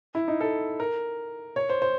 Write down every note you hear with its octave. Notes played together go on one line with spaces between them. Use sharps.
E4
D#4
A4
A#4
C#5
C5
C5